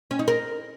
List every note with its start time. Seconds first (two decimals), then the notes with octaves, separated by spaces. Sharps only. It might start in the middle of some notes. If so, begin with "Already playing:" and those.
0.11 C#4
0.19 D#4
0.28 A#4